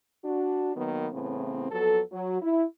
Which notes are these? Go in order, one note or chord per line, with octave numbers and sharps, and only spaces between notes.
D4 F#4
D#3 F#3 A#3 B3
A2 C#3 E3 B3 C4
F2 F#3 B3 A4
F#3
E4